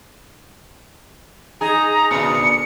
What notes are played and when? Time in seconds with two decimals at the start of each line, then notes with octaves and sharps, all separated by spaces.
1.61 D#4 G#4 A#5
2.11 A#2 D3 C#7